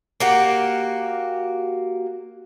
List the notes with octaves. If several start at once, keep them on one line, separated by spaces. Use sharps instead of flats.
A#3 F#4 G4